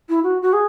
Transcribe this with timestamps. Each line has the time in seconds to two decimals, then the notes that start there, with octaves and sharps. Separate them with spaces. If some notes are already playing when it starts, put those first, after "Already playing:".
0.09 E4
0.23 F#4
0.42 F#4
0.53 G#4